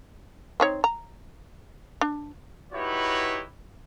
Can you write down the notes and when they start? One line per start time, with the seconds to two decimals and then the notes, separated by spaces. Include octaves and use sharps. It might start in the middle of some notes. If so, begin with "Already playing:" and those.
0.60 C4 D#4 C#5
0.84 A#5
2.01 D4
2.73 D#4 E4 F#4 G4 B4 C#5